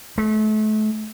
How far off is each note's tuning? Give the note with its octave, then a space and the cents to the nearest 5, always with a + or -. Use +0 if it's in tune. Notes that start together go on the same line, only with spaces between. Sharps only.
A3 -35